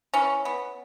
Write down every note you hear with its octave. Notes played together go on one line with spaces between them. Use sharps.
E3 C#4
B3